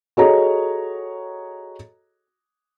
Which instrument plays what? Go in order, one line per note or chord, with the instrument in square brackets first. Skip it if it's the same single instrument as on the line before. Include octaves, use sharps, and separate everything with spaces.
[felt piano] F#4 G#4 A4 C#5 D#5 A#5